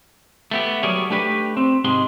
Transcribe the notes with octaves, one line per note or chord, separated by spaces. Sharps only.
A3 B3 G4
F#3 G3 G#4 A#4 C#5 D5
A3 D4 G4 B4
C4
G#2 C3 G#3 C6